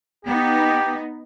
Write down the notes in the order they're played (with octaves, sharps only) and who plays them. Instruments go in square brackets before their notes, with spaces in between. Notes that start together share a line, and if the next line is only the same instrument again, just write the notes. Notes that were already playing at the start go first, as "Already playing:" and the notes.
[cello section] B3 D#4 [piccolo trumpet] G4